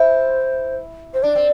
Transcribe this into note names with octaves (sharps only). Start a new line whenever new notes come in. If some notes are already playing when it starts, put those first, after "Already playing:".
Already playing: E4 C5
C5
D4 D5
C4